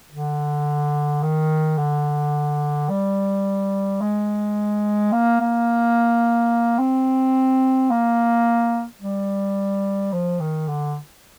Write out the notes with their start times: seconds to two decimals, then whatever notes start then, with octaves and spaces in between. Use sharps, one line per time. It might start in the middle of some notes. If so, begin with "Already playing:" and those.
0.12 D3
1.23 D#3
1.78 D3
2.90 G3
4.01 G#3
5.12 A#3
5.40 A#3
6.78 C4
7.90 A#3
9.02 G3
10.12 F3
10.40 D#3
10.68 D3